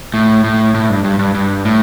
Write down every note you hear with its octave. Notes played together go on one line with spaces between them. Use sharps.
A2
A2
A2
G2
G2
G2
G2
A2